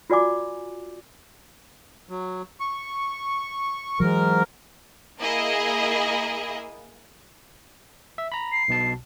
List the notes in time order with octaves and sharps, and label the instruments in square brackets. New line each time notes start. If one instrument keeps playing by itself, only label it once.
[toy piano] F4 F#4 D5 G#5 D6
[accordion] F#3
C#6
[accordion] G#2 A#4 [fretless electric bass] E3 F#3
[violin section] A#3 E4 G#4 D#5
[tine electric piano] E5
A#5 B5
[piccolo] C7
[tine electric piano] B1 B2 A5